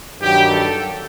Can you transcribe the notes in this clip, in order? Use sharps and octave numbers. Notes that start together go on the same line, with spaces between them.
G2 D#3 F#3 G4
A4